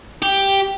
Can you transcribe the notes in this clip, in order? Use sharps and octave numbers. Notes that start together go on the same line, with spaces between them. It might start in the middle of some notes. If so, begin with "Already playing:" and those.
G4